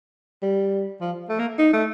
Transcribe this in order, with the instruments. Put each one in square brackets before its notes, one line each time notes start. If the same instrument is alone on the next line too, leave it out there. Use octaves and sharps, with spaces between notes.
[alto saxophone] G3
F3
A3
A#3
D#4
A3